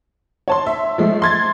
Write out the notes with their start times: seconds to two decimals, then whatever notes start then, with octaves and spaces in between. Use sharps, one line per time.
0.48 C#5 A5 C6
0.67 E5
0.98 F3 G#3 A3
1.22 C6 G#6 A6